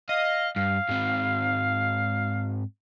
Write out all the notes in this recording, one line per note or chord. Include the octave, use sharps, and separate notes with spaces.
D#5 F5
G2 F5
G#2 C4